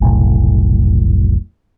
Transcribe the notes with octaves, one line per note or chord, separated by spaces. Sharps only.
F1 B1 A2